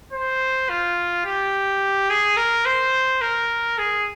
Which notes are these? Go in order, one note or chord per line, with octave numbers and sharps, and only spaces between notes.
C5
F4
G4
G#4
A#4
C5
A#4
G#4